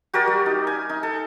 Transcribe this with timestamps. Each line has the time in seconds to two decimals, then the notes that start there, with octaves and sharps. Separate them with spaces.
0.14 F#4 G4 A#4 D5
0.27 G3
0.46 D#4
0.67 G#5
0.90 D#4
1.03 A4